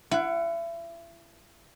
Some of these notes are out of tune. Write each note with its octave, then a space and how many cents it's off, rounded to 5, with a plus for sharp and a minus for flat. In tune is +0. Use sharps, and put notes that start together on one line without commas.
E4 +35 F#5 +0